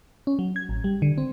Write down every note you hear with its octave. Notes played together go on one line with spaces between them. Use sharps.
C#4
F#3
G#6
A1
G3
D3
C4